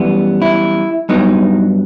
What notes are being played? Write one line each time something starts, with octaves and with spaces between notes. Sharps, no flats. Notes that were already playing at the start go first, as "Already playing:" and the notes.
Already playing: F#2 E3 G3 B3
E4
G2 F#3 B3 D#4